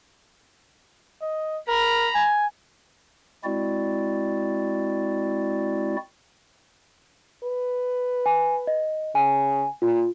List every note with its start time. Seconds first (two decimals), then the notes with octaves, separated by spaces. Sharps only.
1.22 D#5
1.68 A#4 A#5 B5
2.15 G#5
3.44 G#3 C4 E4 F#4 D5
7.44 B4
8.26 G#5
8.67 D#5
9.15 C#3 G#5
9.82 A#2 F4